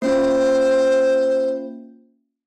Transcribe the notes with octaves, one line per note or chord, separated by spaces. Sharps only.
A#3 C#4 F4 C5